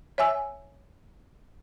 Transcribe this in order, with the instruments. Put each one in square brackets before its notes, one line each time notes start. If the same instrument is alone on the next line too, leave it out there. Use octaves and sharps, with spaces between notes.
[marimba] C#5 E5 G#5 E6